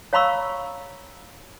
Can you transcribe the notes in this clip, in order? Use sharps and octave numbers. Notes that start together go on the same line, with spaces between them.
C#5 F5 A#5 B5 C#6 E6